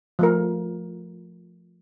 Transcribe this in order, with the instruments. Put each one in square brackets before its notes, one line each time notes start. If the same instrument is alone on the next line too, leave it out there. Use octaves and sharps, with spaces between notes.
[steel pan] F3 A3 A#4